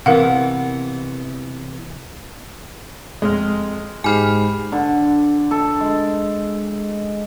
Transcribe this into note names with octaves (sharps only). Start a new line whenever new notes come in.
C3 E3 B3 A#4 F5 F#5
F2 G#3 F6
G#2 G4 G#5 B5 F6 C7
D3
A4
G#3